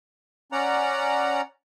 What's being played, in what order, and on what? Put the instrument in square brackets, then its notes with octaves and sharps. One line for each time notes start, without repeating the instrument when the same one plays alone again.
[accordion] C#4 D5 F#5 A#5